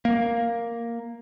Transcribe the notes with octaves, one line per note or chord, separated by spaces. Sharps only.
A#3